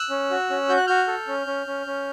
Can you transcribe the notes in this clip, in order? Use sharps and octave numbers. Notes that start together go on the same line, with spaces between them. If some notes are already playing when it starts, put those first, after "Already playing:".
Already playing: E6 F#6
C#4
F#4
C#4
F#4 G6
F#6
F#4 F6 G6
A4
C#4
C#4
C#4
C#4